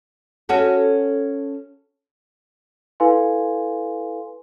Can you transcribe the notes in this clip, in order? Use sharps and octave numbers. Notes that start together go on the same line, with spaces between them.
C#4 F#4 A4
E4 A4 B4 F5 G#5 C6